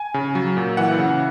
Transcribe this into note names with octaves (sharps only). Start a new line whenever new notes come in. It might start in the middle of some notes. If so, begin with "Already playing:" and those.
Already playing: G#5
C#3
F#3
A#2
E3 F#5
C#3